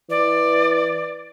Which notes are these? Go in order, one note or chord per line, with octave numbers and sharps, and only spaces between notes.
E3 D5